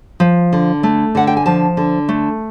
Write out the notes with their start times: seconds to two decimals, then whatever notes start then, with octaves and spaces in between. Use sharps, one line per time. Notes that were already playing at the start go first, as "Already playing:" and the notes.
0.20 F3
0.53 D3
0.83 A3
1.15 D3 F#5
1.27 G5
1.37 G#5
1.46 F3 A5
1.77 D3
2.09 A3